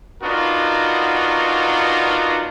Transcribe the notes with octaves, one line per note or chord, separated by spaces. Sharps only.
B3 D4 D#4 F4 F#4 A#4